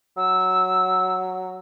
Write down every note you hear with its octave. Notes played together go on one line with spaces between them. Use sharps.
F#3 E6